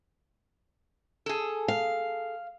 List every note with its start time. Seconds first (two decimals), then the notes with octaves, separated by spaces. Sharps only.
1.26 G#4 A4
1.68 F5